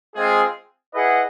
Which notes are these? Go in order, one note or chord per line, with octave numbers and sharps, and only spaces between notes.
G#3 C4 F4 G#4
E4 G#4 B4 D#5 F#5